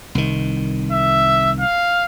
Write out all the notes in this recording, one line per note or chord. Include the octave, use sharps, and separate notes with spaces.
C2 D#3
E5
F5